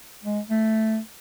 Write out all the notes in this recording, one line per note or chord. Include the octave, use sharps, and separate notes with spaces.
G#3
A3